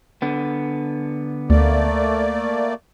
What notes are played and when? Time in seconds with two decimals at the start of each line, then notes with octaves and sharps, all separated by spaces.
0.22 D3 B3
1.50 D2 A3 A#3 D5